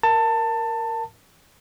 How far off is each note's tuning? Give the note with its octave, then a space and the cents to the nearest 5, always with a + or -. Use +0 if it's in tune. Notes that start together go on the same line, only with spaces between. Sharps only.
A#4 +0 A5 +20